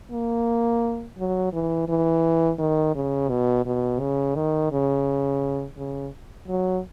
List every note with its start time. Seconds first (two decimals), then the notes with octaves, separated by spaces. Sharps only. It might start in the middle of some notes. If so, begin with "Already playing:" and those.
0.12 A#3
1.18 F#3
1.53 E3
1.88 E3
2.59 D#3
2.95 C#3
3.29 B2
3.66 B2
4.00 C#3
4.36 D#3
4.72 C#3
5.77 C#3
6.48 F#3